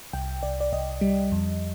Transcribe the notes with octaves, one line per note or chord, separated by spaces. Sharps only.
C2 G5
C2 D5
D5
C2 D#5
G3
F2